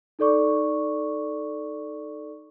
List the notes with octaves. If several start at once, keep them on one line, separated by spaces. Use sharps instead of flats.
D#4 A4 D5 C#6 D6